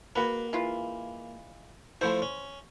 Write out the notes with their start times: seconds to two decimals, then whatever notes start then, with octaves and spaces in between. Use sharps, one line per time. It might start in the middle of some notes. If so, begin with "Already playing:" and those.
0.16 G#3 A#3 F#4 B4
0.53 E3 G#3 F4
2.01 F3 A3 E4 C5 F#5 C6
2.22 C#4